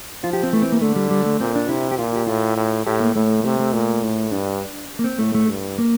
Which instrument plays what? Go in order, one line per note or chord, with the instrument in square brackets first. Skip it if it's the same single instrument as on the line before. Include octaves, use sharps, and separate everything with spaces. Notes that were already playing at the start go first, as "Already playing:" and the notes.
[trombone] F3 [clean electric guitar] F4
[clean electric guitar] G4
C4
[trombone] E3 [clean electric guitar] A3
[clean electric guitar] C4
A#3
[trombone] D3 [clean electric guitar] A3
[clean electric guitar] G3
G3
A3
[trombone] A#2 [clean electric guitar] C4
[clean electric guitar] D4
[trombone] C3 [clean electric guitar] E4
[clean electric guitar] G4
[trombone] A#2 [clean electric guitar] F4
[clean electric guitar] G4
[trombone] A2 [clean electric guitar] F4
[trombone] A2
[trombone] A2 [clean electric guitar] G4
[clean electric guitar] A#3
[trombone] A2 [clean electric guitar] A3
[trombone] C3 [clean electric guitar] A3
[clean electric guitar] A3
[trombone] A#2
A2
[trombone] G2 [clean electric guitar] D4
[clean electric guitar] A#3
C4
[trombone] A2 [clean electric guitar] A3
[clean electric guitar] A3
[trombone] G2
[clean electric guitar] A#3